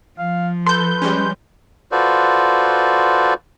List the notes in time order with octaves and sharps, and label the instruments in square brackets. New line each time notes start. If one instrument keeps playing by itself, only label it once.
[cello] F3 [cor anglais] F5
[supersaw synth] A4 [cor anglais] B4 [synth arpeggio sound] C6 G6
[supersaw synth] G3 G#3 C#4
[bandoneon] F4 F#4 A4 B4 C5 D5